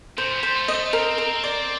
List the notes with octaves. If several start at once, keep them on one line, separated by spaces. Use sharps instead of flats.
A#2 C5
G3
C5
A3
D#5
A3
C4 A#4
A#4
D5